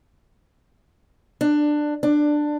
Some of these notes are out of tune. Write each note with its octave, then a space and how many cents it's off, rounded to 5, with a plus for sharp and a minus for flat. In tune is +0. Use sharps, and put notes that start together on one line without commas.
D4 +15
D4 +15